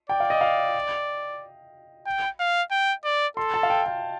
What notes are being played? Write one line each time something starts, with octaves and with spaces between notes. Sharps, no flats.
D5 G5
F5
D#5
F5
G5
F5
G5
D5
A4 C6
A5
F5
G5
G5